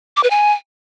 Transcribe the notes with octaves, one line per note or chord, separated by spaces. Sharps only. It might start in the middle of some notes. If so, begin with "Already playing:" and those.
D6
B4
G#5